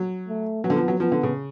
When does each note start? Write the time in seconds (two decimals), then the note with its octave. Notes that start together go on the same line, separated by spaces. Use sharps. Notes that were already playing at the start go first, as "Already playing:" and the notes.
Already playing: F#3
0.28 A3
0.64 F#3 B3
0.70 D3
0.76 F3
0.88 F#3
1.00 F3 B3
1.12 D3
1.23 C#3